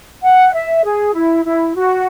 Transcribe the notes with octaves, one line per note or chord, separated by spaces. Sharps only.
F#5
E5
G#4
E4
E4
F#4